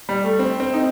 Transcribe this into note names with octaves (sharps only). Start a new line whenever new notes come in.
G3
A3
C4
C4
D#4